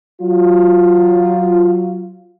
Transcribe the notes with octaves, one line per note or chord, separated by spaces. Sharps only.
F#3 F4